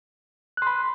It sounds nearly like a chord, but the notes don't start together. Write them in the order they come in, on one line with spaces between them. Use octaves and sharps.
F#6 C6 B5